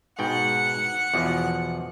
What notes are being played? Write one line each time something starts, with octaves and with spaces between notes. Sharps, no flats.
G#2 B2 F#5 G5 F#6
E2 B2 F3